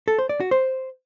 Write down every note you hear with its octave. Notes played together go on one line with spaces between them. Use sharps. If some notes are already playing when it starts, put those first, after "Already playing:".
A4
C5
D5
F#4
C5